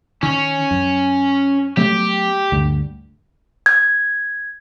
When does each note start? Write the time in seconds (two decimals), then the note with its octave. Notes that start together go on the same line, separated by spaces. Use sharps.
0.23 D#3 C#4
0.71 F#2
1.77 F#3 A3 B3 G4
2.52 D2 G2
3.66 G#6